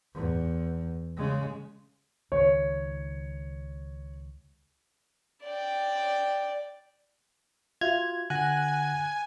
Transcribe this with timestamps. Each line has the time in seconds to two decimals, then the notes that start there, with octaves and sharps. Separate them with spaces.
0.14 E2
1.17 C#3 G#3
2.32 C#2 D#3 C#5
5.44 D5 G5
7.81 F4 F#4 E5 G#6 F7
8.30 D3 F#5 G#5 F#6 A#6